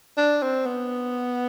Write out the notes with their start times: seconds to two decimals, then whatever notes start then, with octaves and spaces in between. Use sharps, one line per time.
0.17 D4
0.42 C4
0.66 B3